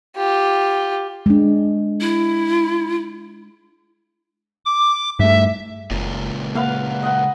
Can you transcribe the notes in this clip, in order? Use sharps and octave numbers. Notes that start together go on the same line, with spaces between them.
F4 G4
G#3 D4
E4
D6
G2 A3 E5
F#1 C#2 A#2
A#3 B4 F5 F#5
D#5 F#5